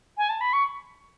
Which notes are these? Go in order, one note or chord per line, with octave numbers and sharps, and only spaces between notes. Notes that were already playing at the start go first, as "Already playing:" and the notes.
G#5
A5
B5
C#6